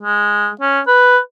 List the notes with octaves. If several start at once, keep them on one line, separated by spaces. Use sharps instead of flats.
G#3
C#4
B4